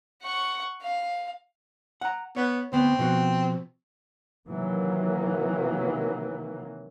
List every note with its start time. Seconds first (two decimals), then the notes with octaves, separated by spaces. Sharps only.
0.22 F#5 C#6
0.82 F5
2.01 F#5 A#5
2.36 B3 C#5
2.73 D2 B3 C4
2.99 B2 F3 F#4
4.48 C3 D#3 E3 F#3 A#3